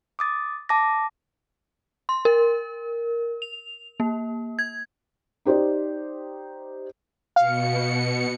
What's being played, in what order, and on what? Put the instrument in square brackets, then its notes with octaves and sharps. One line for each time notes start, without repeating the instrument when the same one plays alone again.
[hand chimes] D6 D#6 A6
A5 D6 A#6
[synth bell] C6
A#4
F7
A#3
G#6
[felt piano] D#4 G4 C5 D5
[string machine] B2 C#7 [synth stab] F5